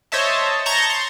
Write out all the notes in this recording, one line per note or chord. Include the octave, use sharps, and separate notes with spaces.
C5 C#5 D#5 E5 A5
A5 A#5 C#6 G6 G#6 A#6
C6